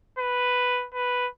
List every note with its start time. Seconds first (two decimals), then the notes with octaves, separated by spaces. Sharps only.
0.19 B4
0.94 B4